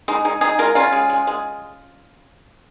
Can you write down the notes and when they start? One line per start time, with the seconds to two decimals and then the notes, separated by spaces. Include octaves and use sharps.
0.08 G#3 D#4
0.25 G#3 D#4
0.41 G#3 D#4 G#4
0.59 G#3 F4 A#4
0.75 C#3 C#4 F4
0.92 G#3
1.09 G#3
1.27 G#3